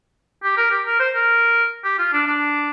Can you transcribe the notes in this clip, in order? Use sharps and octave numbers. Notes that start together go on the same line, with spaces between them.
G4
A#4
G4
A#4
C5
A#4
G4
F4
D4
D4